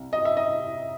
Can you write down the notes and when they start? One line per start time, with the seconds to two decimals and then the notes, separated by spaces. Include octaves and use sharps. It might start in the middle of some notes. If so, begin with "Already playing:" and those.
Already playing: C2 C3
0.13 D#5
0.25 E5
0.37 D#5